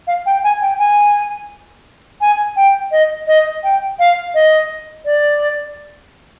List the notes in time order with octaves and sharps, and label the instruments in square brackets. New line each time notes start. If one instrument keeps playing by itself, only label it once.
[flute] F5
G5
G#5
G5
G#5
G#5
G5
D#5
D#5
G5
F5
D#5
D5